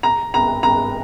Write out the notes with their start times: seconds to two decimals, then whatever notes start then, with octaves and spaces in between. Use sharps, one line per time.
0.03 A#5
0.34 A#5
0.63 A#5